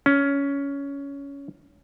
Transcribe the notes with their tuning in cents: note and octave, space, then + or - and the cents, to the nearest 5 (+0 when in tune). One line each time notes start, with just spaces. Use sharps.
C#4 +15